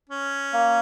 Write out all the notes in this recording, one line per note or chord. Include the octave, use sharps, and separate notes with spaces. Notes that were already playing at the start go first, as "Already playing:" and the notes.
C#4
A#3